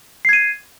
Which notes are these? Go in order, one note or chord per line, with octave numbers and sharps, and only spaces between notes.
G#6 C7 D#7